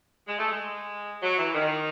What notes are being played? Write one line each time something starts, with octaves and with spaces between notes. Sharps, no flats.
G#3
A3
G#3
F#3
E3
D#3